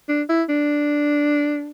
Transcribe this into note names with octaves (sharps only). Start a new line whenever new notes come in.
D4
E4
D4